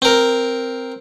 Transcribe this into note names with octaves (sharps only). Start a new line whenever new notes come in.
C4 A#4